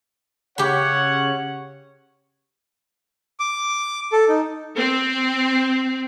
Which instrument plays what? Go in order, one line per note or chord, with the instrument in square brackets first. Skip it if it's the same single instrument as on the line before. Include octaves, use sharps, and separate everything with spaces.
[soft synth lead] C#3 [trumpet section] C#4 F#5 [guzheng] G4 B5 [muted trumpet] C#5
[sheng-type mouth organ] D6
A4
D#4
[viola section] C4